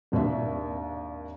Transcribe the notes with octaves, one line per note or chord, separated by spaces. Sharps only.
G#1 D#2 D4 E5